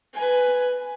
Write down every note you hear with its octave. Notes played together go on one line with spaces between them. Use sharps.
B4 G#5